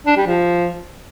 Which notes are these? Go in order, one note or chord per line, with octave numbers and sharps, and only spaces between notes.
D4
G3
F3